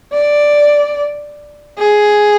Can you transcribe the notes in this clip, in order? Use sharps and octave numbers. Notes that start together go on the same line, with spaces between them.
D5
G#4